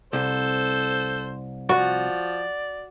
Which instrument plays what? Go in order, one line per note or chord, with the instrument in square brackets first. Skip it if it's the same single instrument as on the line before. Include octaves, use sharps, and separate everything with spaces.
[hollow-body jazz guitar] C2 [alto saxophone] A4 [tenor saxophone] C5
[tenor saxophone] F3 [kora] F#4 [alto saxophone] D5